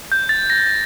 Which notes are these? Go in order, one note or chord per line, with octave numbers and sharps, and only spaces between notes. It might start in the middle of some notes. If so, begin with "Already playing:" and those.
G6
A6
A#6